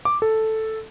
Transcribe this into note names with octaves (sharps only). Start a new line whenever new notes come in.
D6
A4